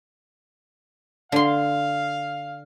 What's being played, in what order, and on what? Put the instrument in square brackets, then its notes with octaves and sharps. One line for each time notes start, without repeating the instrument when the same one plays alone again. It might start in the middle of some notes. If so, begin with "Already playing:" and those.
[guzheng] D3 C6 [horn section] F5